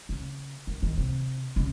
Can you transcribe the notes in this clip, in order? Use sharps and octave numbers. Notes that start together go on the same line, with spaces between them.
C#3
D#3
D#3
C3
C#3